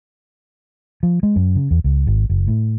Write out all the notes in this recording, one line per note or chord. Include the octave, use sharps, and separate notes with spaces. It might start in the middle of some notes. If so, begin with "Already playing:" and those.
F3
G#3
F#2
C#3
E2
C#2
G#1
F#1
A2